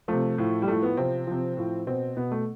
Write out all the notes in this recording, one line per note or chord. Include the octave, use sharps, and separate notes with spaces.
C3 F3 A3
A2 F3
G3
A2 F3 A3
B3
C3 F3 C4
C3 F3
A2 F3
B2 C4
B2 B3
A3